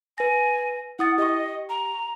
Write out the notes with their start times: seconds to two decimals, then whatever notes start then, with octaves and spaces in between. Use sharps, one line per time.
0.18 B4 G#5 A#6
0.99 E4 F#5 D#6 A6
1.18 G4 D#5 C#6
1.69 A#5